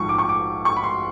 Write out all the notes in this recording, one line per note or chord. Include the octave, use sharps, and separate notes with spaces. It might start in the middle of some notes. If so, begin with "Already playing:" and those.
Already playing: A#1 G#2 F3 C#6
D6
C#6
D6
C#6
B5
C6